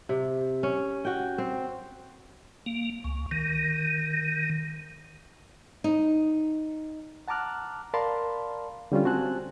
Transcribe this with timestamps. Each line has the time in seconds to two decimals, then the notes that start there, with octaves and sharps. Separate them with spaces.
0.09 C3
0.63 C#4
1.05 F#4 G5
1.38 C4
2.66 A#3
3.04 C#2
3.31 D#3
5.84 D#4
7.28 F#5 A5 A#5 D6 F6 F#6
7.94 A#4 D5 F5 A5 B5 C6
8.92 D3 G3 C#4 F4
9.05 C4 F#4 C5 G#5 A5 F#6